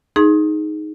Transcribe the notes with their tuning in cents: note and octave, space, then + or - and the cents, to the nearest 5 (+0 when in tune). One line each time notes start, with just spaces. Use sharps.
D#4 +0 G#4 +10 C6 +35